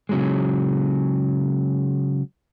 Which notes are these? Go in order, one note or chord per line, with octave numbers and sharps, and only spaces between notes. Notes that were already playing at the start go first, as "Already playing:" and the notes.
C#3 F#3 G#3